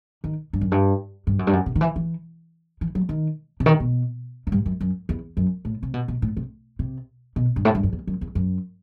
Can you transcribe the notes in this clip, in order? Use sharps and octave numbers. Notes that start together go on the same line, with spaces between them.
D#3
G2
F#2
G2
G2
F#2
G2
F#2
C3
D#3
E3
E3
E3
F#3
D#3
C3
D#3
B2
F#2
G2
F#2
F#2
E2
F#2
A2
C3
B2
B2
A2
C3
C3
B2
G2
A2
G2
F#2
E2
F#2
E2
F#2